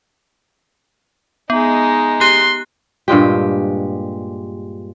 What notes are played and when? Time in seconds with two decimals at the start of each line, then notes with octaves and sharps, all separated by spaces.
1.50 G#3 B3 D#4
2.21 G4 C6 F#6
3.08 G2 A#2 G#3 G4